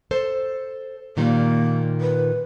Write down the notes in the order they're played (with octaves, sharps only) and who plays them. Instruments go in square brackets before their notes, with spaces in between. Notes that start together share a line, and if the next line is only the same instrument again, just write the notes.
[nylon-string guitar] A4 C5
[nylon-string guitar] A#2 D#3 G3 [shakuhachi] A#3
[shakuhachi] B4